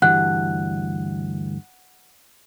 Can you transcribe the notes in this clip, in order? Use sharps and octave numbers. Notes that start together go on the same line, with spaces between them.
D2 G2 E3 F#5 F#6